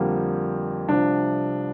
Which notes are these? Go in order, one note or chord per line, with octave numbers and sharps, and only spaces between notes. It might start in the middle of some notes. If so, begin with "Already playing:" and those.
Already playing: F2 D3 G3 A#3
C2 C3 F3 D4